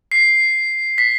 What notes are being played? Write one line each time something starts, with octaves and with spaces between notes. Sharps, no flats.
C7
B6